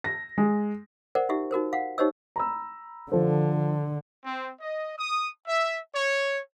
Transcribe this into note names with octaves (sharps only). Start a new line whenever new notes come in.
A#6
G#3
A#4 C5 D5 F#5
D#4 F4 G4 E5
D#4 F#4 A#4 C5
F5 F#5
D#4 G4 C5 C#5 D#5 E6
A#5 B5 E6
D3 F3 A4 C5
C4
D#5
D#6
E5
C#5